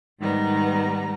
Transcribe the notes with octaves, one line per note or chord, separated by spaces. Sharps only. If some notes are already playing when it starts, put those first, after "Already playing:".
G#2 D#3 G3 B3 A#5